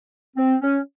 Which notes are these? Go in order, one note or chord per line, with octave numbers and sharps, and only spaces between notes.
C4
C#4